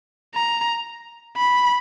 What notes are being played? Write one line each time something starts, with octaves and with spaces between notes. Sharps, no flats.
A#5
B5